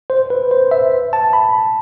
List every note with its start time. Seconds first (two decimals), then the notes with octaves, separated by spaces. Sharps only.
0.10 C5
0.30 B4
0.51 C5
0.71 E5
1.13 A5
1.33 B5